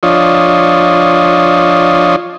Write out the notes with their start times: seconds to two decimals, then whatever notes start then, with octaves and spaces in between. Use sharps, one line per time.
0.03 F3 D4 F4 C#5 D#5